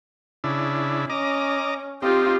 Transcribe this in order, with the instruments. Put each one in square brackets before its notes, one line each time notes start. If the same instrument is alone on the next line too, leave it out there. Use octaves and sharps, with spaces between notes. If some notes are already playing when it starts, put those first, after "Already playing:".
[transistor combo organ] C#3 D4 E4
[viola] C#4 [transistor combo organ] D#5 A#5 D6
[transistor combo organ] C4 D#4 [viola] F4 G4